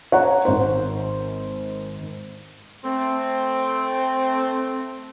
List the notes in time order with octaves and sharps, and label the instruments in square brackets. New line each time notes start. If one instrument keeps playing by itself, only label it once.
[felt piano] C#5 F#5 A#5
G#1 C5
[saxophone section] A3 C4